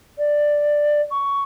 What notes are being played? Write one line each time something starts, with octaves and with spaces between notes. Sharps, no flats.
D5
C#6